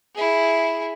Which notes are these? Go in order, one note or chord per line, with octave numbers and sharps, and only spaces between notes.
E4 G#4